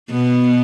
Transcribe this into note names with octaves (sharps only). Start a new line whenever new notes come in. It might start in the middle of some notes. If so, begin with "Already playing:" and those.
B2 B3